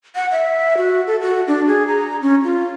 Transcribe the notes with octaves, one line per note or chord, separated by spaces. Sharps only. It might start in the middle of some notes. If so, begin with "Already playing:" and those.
F#5
E5
F#4
A4
F#4
D4
G#4
A#5
C#4
F4